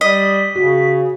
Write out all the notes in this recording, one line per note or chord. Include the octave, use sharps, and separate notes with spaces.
G3 D#5 B6
C#3 F#4